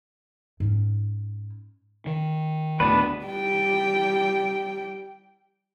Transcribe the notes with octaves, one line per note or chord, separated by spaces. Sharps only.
G#2 C#4
D#3
D2 A2 D3 B3 D4 B4
G3 G5